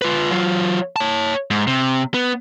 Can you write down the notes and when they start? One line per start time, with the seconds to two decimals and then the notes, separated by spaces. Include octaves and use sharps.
0.02 F4 B4
0.31 F#3 F4
0.96 C#5 A5
1.51 G#2
1.67 C3
2.14 B3